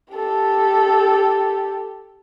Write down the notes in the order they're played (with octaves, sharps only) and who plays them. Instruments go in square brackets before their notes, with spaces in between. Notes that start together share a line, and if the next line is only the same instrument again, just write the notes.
[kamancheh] G4 A4